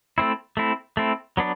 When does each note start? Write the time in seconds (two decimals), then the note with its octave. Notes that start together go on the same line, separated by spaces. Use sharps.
0.18 A3 C4 E4
0.57 A3 C4 E4
0.97 A3 C4 E4
1.37 F#3 B3 D4